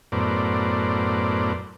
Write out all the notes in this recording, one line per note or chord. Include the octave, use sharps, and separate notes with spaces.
F#2 A2 B3 A#4 C5 D5